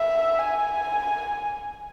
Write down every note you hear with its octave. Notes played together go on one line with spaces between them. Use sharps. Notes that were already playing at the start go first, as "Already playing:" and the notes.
Already playing: E5
G#5